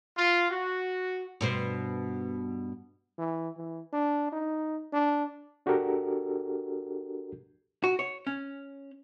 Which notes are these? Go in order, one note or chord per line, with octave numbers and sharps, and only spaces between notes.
F4
F#4
G2 B2 C5
E3
E3
D4
D#4
D4
D4 F#4 G4 A4 A#4
F#4
C#5
C#4